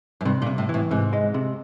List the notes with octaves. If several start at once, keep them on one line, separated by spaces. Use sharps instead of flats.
F#2
G2 C3
A#2
C3
A2
A2 E3
G#2 C3
G#3
C3